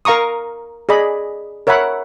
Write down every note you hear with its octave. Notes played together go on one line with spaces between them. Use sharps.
A#4 F5 A#5 C#6 D#6
G#4 D5 D#5 B5
A#4 C#5 E5 F#5 B5